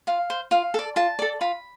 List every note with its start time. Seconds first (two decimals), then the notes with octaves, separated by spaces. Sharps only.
0.07 F4 F5
0.30 C5
0.51 F4 F5
0.74 A4 D5
0.96 F4 A5
1.19 A4 D5
1.41 F4 B5